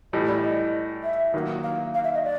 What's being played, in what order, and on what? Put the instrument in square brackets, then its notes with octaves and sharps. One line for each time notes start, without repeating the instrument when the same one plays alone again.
[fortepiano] A2 E3 G3 [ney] D#5
[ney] D5
D#5
E5
[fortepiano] D#3 F#3 A#3
[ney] F5
F5
E5
D#5
D5